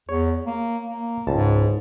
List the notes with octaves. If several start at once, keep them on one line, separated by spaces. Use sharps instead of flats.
E2 C#5
A#3
A#3
C#2 G#2 A5